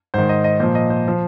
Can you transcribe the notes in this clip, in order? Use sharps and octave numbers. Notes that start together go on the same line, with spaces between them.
G#2 D#3 C5
D#5
D#5
A#2 F3 C5
D#5
C5
F3